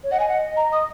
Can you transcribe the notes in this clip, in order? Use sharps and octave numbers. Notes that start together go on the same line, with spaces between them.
C#5
D#5 F#5
G#5
F#5
A#5
D#6